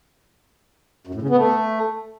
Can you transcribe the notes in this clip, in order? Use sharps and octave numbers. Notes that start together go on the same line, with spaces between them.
F#2
A2
C#3
B3
A3